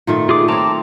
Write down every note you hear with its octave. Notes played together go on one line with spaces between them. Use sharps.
A#2 D#3 A3
F4 G#4 D6
C4 C#5 A5 A#5 D6